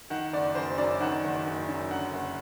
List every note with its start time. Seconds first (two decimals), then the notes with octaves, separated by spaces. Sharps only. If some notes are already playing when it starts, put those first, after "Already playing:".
0.10 D#3 F#5
0.33 F#1 D5
0.55 F#1 C5
0.78 F#2 D5
1.01 D#3 F#5
1.23 F#1
1.46 F#1
1.68 F#2
1.91 D3 F#5
2.13 F#1